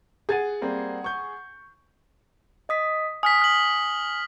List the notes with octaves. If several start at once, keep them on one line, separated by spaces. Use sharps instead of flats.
G#4 F#5 G#6 A6 D#7
G3 A#3 C4
C#6 G6
D#5 D#6 B6
G#5 D#6 F6 B6
F6 F#7